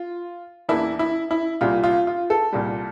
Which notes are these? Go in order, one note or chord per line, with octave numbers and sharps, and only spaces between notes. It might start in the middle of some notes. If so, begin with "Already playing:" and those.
Already playing: F4
E2 E3 A#3 D4 E4
E4
E4
C2 A#2 G3 F4
F4
F4
A4
C2 A#2 G3